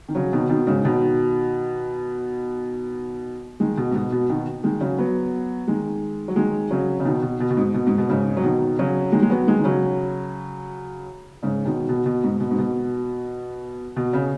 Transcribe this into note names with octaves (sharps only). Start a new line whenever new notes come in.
D#3
C#3 F#3
B2 D#3
B2 D#3
G#2 C#3
B2 D#3
D#3 G#3
B2
G#2
B2
B2
B2 D#3
D#3 G#3
C#3 F#3
F#3 B3
D#3 G#3
F#3
D#3 G#3
C#3 F#3
C#3
B2 D#3
B2
B2
B2
G#2
B2
G#2
B2
G#2 C#3
F#3
B2 D#3
C#3 F#3
D#3 G#3
G#3
F#3 B3
D#3 G#3
D#3
C#3 F#3
G#2 C#3
B2 D#3
B2
B2
G#2
B2
G#2
B2
B2
C#3